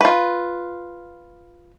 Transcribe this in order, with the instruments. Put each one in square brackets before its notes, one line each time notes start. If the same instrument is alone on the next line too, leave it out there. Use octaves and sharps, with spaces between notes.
[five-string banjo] F4 B4